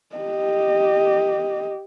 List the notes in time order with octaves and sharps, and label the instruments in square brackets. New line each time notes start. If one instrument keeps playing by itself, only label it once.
[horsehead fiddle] G4 D#5